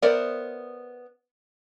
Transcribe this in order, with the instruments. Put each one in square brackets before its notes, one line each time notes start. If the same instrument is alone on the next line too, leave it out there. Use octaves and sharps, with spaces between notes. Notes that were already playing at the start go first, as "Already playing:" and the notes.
[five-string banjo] B3 A#4 C5 D5 E5